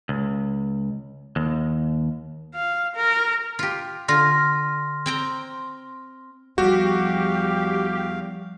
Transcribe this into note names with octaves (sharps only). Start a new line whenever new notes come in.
C#2
D#2
F5
A#4
F4 G4
D3 F4 C6 F6 A#6
C4 G5 A#5
E2 F3 G3 F#4 G4 F5